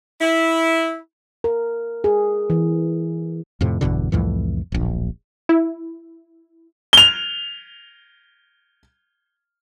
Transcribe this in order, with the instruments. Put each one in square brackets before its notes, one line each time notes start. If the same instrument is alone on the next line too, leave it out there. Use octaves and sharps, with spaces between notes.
[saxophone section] E4
[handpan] A#4
G#4
E3
[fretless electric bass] F2 A2 C3
G1 E2 B2 D3
C2 F2 A2 E3
D1 A#1
[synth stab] E4
[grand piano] F7 G7